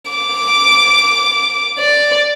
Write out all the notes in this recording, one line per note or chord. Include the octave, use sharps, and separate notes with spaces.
D6
D5